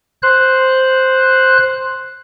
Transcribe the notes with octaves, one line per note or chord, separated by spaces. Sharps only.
C5 F#6